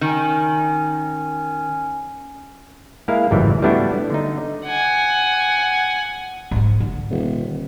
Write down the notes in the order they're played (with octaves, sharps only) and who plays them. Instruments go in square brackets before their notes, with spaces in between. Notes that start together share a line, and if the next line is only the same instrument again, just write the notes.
[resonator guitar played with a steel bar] D#3 [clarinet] C#4
[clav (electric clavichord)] G#3 A#3 E4 A#4 F5
G#1 C#2 F#2 A2 E3 G3
G3 A3 B3 D4 E4 F#4
D3 D#4
[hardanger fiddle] F#5 G#5
[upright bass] G#2 G#3
D3
[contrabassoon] D#1